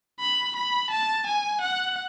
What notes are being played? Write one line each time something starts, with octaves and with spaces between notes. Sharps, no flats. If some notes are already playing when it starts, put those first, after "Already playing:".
B5
B5
A5
G#5
F#5